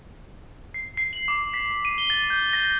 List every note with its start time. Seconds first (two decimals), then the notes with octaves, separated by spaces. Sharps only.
0.74 C7
0.97 C7
1.13 F#7
1.28 D6
1.54 B6
1.85 D#7
1.98 G7
2.10 A6
2.30 G6
2.53 A#6